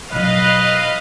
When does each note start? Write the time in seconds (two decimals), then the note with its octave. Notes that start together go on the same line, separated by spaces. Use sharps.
0.12 B2 F#3 B4 D#5 F5